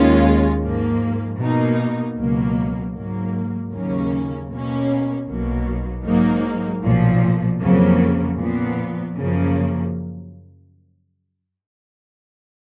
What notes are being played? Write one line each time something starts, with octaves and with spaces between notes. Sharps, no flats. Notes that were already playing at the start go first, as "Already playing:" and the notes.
Already playing: D#2 D#3 G#3 C#4 F4
G#2 F3 A#3
B2 A#3 D#4
C#2 B2 F#3 A#3
G#2 F#3 A#3
D#2 C#3 F#3 A#3 C#4
B2 A#3 C#4
B1 B2 F#3 A#3
G#2 F#3 A#3 D#4
B1 A#2 F3
F2 C#3 F#3 A#3
A#2 F3 B3
F#2 C#3 F3 A#3